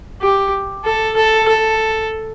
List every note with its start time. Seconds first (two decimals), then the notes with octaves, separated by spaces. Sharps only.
0.21 G4
0.84 A4
1.16 A4
1.48 A4